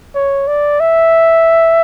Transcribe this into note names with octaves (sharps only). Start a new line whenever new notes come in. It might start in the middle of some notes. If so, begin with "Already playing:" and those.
C#5
D5
E5